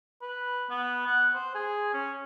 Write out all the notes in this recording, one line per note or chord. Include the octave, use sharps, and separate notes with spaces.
B4
B3
F#5
C5
G#4
C#4